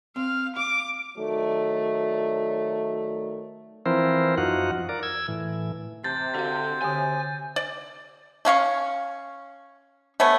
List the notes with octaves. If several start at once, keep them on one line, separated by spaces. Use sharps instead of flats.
C4 F5
F5 D6
D#3 F#3 A3 D5
E3 F3 C4 E4 A#4 C5
F#2 F3 D#4 F4 F#4 F#5
A#4 D5
E6 G#6
A2 E3
C3 A5 G6 A6
D3 F#4 F5
D3 G4 C#5 G#5
D5
A3 C#4 F5 C#6
A3 B3 C#5 G#5